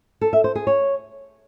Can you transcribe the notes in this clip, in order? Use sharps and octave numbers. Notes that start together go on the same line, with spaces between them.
A4
E5
C5
G#4
C#5